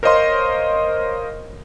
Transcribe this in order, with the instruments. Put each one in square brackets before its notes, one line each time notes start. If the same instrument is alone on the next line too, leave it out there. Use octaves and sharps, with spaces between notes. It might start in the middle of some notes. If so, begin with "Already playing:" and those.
[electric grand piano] A#4 C5 C#5 D#5 F5 C6